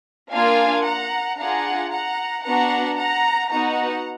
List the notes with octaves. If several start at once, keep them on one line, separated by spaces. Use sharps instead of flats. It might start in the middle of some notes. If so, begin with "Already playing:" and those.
A#3 D4 F4 F5 G#5
F#5 A#5
D4 F4 G#4 F#5 A#5
F#5 A#5
B3 D4 F#4 F#5 A#5
F#5 A#5
B3 D#4 F#4 F#5 A#5